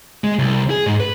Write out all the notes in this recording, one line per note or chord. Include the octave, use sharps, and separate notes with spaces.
G#3
C2
G#4
G#2
B4